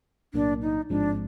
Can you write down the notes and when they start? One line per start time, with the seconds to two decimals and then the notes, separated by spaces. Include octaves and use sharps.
0.34 B1 A2 F#3 A#3 D4
0.62 D#4
0.90 A1 G#2 F3 G#3 C4 D4